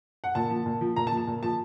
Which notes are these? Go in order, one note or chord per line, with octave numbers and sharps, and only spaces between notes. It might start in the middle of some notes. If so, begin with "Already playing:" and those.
F#5
A#2 A5
F3
A#2
F3
A#2 A#5
A5
F3
A5
A#2
F3 A5